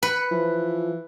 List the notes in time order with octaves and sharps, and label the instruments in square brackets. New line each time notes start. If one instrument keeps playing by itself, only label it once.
[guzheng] B4 [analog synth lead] C#7
[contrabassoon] E3 [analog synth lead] F3